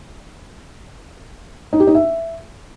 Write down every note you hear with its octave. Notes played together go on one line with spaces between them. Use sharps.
D#4
G4
D#4
E5